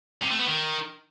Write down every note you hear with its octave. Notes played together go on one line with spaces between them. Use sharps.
C3
A3
B3
D#3